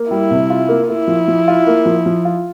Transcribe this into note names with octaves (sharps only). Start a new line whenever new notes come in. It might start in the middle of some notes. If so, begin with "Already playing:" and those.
Already playing: A#3
G3 E4
C3
F4
A#3
A#3 E4
F3
F3
F4
A#3
F3
F3
F4